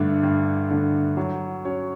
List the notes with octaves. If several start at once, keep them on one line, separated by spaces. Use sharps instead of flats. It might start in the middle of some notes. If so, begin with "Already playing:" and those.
Already playing: G2 D3 A3 D4
G2
D3 A3 D4
F#3
C#4 F#4 C#5